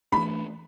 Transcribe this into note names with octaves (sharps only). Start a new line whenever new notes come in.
E3 A3 D4 B5